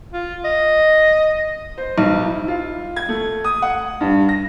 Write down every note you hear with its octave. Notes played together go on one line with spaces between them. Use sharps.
F4
D#5
C5
B1
E4
F4
G#6
A3
D#6
F#5
G2
A#6